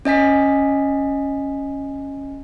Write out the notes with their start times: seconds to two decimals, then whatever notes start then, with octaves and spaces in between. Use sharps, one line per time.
0.05 C#4 D#5 G#5 B6